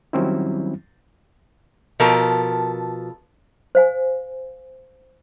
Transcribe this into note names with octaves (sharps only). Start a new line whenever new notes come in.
D#3 F#3 G3 C4 C#4 E4
B2 F3 A4 A#4
C5 F5 G#5